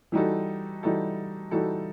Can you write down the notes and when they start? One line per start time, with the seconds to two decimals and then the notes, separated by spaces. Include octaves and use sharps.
0.12 E3 G3 D#4 F#4 A4
0.83 E3 G3 D#4 F#4 A4
1.51 E3 G3 D#4 F#4 A4